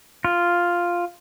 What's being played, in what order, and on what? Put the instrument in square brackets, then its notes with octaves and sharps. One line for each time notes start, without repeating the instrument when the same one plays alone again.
[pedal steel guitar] F4